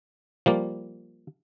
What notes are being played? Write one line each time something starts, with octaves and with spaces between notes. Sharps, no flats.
F3 G3 A#3